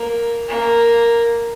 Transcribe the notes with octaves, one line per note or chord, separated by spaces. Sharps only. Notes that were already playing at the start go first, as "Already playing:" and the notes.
Already playing: A#3
A#3